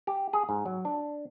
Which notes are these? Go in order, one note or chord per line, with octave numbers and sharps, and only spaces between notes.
G4
G#4
G#2
F#3
D4